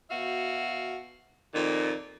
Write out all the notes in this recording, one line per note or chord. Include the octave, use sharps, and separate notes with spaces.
B2 F#4 E5 F5
F2 A#2 D#3